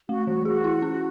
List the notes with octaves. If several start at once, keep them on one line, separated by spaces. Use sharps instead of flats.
A3 F#4
E3 F#4
F#4 G#4
E4
C#4